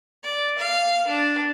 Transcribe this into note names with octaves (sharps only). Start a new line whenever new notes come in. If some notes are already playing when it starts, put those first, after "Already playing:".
D5
F5
D4